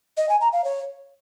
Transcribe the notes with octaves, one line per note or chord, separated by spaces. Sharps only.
D#5
G#5
A#5
F5
C#5